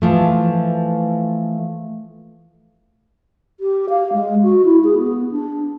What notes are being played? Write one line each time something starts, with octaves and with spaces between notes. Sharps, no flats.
E3 F3 A3
G4
F5
G#3
F#4
E4
G#4
B3
D4